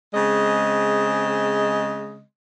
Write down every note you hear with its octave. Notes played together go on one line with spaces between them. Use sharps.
C#3 G#3 C4 D#5